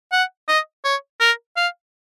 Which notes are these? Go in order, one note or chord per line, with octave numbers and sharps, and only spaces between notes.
F#5
D#5
C#5
A#4
F5